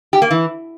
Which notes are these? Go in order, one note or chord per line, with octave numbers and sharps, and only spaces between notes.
G4
A#3
E3